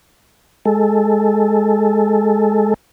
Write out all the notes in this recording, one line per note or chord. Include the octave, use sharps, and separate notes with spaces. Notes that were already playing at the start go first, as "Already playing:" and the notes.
G#3 A4